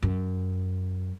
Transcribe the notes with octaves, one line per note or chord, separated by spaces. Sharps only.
F#2